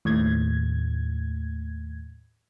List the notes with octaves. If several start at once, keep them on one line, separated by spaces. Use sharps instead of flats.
D#2 A2 G#6